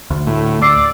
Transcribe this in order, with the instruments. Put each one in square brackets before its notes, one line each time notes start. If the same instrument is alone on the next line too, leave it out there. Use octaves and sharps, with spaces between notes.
[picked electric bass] D2
[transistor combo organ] A2
[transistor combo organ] D5 [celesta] D6 E6 C7